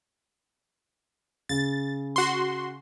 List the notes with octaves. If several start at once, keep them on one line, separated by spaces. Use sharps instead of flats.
C#3 A6
F#4 C6